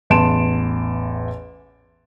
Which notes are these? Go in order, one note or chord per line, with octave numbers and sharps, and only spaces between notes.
A1 E2 A5 C6 D7 E7